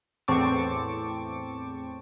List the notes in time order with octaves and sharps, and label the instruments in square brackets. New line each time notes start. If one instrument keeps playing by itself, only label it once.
[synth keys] E2 A2 C4 A5 C#6 D6